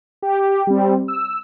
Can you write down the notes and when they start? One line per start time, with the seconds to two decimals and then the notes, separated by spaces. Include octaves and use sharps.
0.22 G4
0.67 G3 C4
1.08 E6